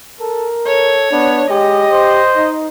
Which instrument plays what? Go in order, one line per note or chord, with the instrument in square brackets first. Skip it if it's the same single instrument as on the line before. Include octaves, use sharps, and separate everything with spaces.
[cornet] A4 [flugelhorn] A#4
[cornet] A4 [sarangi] C#5
[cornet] B3 [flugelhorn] D4
[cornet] G#3 [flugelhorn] G4 [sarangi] D#5
[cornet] C5
[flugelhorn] D#4